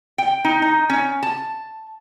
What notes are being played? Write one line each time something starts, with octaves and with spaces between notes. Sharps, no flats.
G5
D#4
D#4
C#4
A5